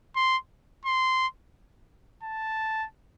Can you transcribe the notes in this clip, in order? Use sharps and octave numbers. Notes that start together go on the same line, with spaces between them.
C6
C6
A5